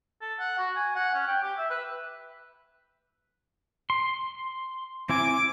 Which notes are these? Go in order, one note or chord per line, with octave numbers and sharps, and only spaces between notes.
A4
F#5
F#4
G#5
F#5
C#4
G5
G4
E5
B4
C6
C4 E4 G#5 D6